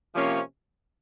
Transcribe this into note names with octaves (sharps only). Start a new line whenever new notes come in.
C3 F3 A#3 C#4